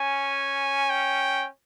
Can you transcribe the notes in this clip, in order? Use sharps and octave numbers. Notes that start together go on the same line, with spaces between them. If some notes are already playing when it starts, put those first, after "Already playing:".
Already playing: C#4 G#5
G5